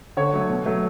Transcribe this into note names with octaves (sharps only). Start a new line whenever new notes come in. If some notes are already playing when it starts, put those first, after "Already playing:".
D3 C#5
F#3 A3
B2
F#3 A3